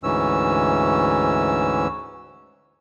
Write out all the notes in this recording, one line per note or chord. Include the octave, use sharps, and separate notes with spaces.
D2 G#2 E3 C#4 E6